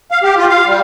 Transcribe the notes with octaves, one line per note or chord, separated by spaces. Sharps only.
F5
G4
F4
F5
G3